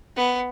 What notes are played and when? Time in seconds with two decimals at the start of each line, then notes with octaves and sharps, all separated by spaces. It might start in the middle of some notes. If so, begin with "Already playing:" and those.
0.17 B3